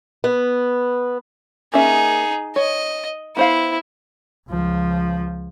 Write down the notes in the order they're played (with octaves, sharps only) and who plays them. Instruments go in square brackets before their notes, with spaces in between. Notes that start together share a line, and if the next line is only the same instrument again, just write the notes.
[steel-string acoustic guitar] B3
[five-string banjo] A#3 C#4 E5 [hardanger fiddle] D#4 G#4
[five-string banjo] C#5 [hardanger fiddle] D#5
[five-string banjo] B3 C5 F5 [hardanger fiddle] E4
[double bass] C#2 F3